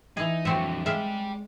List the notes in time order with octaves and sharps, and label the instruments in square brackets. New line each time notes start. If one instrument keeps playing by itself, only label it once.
[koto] E3 G#4 [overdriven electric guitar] D#4
[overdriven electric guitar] F2 D3 [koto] C4 E5 [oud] F#4
[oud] G#3 [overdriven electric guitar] D5 G5 [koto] E5 F5